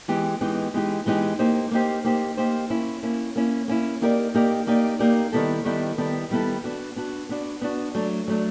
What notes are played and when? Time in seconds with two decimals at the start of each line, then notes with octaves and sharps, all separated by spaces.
0.08 E3 G#3 B3 D#4 G4
0.41 E3 G#3 B3 D#4 G4
0.74 E3 G#3 B3 D#4 G4
1.06 E3 G#3 B3 D#4 G4
1.39 A#3 D#4 G4 C5
1.71 A#3 D#4 G4 C5
2.05 A#3 D#4 G4 C5
2.37 A#3 D#4 G4 C5
2.70 A#3 C#4 E4
3.03 A#3 C#4 E4
3.36 A#3 C#4 E4
3.68 A#3 C#4 E4
4.01 A#3 D#4 G4 A#4 D5
4.34 A#3 D#4 G4 A#4 D5
4.67 A#3 D#4 G4 A#4 D5
4.99 A#3 D#4 G4 A#4 D5
5.32 D#3 G3 B3 E4 A4
5.65 D#3 G3 B3 E4 A4
5.98 D#3 G3 B3 E4 A4
6.30 D#3 G3 B3 E4 A4
6.64 B3 D4 F#4
6.96 B3 D4 F#4
7.29 B3 D4 F#4
7.61 B3 D4 F#4
7.95 F#3 A3 D4
8.28 F#3 A3 D4